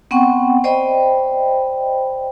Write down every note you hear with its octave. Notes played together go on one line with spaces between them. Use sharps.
B3 C4 F#5 G5 C#6
C5 D5 D#5 G5 B5